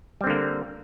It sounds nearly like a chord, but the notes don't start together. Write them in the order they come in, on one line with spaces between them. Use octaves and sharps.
G3 C4 D3 A#3